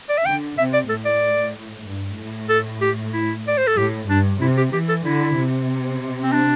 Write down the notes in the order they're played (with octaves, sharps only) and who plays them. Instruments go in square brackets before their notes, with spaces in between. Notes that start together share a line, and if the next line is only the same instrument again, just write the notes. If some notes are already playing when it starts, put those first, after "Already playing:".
[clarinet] D5
E5
[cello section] D3 [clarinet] G5
[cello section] C3 [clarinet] E5
[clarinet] D5
[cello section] A2 [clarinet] A4
[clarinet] D5
[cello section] G2
A2
[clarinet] A4
G4
E4
D5
C5
A4
[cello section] A2 [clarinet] G4
[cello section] G2 [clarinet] D4
[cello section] C3 [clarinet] E4
[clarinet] G4
[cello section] E3 [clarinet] G4
[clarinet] A4
[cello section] D3 [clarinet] E4
[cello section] C3
[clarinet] C4
D4